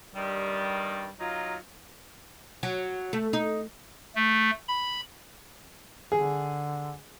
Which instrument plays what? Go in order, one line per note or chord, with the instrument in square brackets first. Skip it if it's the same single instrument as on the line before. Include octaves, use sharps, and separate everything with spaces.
[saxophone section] G2 D#3 G3
F#3 D#4 F4
[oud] F#3
A3
D#4
[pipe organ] A3
B5
[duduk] D3 [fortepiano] G#4